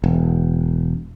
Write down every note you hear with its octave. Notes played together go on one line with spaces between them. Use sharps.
E1